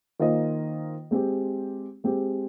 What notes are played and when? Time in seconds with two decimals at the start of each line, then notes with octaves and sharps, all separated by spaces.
0.19 D#3 A#3 F4 C5 D#5
1.11 G#3 C4 G4
2.04 G#3 C4 G4